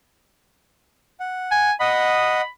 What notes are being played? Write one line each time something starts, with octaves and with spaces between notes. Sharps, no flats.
F#5
G#5
D#5 F#5 B5 D#6